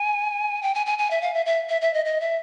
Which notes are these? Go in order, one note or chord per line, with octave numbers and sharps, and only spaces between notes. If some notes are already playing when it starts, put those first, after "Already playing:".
Already playing: G#5
G5
G#5
G#5
G#5
E5
F5
E5
E5
E5
E5
D#5
D#5
E5